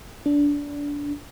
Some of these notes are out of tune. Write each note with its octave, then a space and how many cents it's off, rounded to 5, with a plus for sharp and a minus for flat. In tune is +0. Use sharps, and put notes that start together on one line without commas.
D4 -20